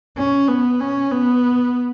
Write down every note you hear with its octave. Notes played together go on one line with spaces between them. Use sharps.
C#4
B3
C#4
B3